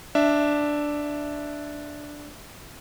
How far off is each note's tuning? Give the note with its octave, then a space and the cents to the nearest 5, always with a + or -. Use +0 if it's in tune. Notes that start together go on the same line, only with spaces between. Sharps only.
D4 +0 E5 +0